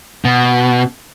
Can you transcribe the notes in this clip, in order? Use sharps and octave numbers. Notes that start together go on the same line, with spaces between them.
B2